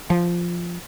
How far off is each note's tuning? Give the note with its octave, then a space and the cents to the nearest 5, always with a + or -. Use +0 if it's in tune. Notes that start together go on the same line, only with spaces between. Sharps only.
F3 -5